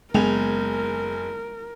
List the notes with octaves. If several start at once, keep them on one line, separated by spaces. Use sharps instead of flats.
F#1 G#3 B3 G#4 A#4 F7